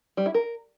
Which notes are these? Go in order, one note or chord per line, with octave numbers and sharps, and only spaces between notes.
G3
E4
A#4